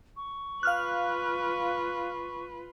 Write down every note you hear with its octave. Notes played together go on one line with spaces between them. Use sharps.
C#6
F4 B4 F5 F6 F#6